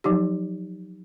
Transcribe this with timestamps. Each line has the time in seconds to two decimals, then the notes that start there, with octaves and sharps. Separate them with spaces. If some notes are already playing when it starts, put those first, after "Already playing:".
0.04 F3 F#3 D#4 G4